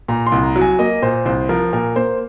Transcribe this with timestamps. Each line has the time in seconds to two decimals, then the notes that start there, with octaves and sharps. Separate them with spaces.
0.08 A#2 A#5
0.27 C6
0.32 C2
0.44 A#5
0.56 F#3
0.62 G#5
0.79 A#3 D#5
1.02 A#2 C5
1.25 C2 C5
1.49 F3 A#4
1.73 A#2 A#4
1.96 A#3 C5